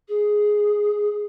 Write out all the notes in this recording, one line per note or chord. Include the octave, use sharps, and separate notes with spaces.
G#4